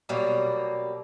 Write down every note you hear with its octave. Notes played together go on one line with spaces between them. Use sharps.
B2 F#3 G3 A#3